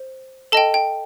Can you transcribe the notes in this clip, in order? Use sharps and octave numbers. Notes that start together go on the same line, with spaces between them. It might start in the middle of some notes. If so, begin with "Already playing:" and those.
Already playing: C5
A4 D#5 G5 A5
G5